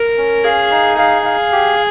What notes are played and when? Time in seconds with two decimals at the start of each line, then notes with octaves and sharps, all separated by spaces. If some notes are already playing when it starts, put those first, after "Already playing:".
Already playing: A#4
0.18 C#4
0.44 G#4 F5
0.71 D#4
0.98 G#4 F5
1.25 F5
1.52 G4